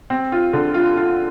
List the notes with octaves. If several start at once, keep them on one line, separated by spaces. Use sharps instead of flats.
C4
F4
D3
F4
F4